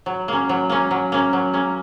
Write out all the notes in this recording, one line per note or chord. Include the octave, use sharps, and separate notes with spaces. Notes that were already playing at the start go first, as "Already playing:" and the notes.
F#3
A#3 C#4
F#3
A#3 C#4
F#3
A#3 C#4
F#3
A#3 C#4